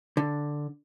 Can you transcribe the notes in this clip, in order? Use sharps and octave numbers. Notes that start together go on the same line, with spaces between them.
D3